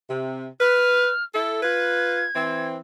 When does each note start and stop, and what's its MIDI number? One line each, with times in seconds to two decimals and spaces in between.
0.10 0.47 48
0.60 1.11 71
0.60 1.23 89
1.35 1.60 64
1.35 1.60 69
1.62 2.24 65
1.62 2.24 71
1.62 2.67 92
2.35 2.77 52
2.35 2.77 60